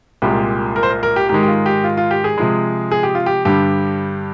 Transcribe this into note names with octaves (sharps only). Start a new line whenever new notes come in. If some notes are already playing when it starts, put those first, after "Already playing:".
C2 A#2 G#3 G4
A#4
C5
A#4
A#4
G4
G#2 D#3 G#3 G4
G4
F4
G4
F4
F4
G4
G#4
C3 F3 G#3
G#4
G4
F4
G4
G2 D3 G3 D4 G4